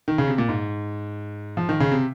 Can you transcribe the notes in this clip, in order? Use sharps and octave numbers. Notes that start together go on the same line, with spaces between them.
D#3
C#3
C3
A#2
G#2
F3
D#3
C#3
C3